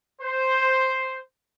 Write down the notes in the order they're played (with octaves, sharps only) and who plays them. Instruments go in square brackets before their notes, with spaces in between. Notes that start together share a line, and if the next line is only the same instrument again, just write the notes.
[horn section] C5